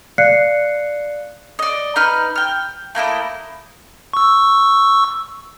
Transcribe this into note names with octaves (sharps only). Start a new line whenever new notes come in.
D5 F5 F#6 C7 C#7
D5 D#5
D#4 B4 F6
G5 F6
A3 A#3 E4 D#5
C#6 E6